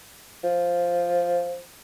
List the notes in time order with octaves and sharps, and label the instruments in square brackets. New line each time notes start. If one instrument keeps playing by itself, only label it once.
[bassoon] F3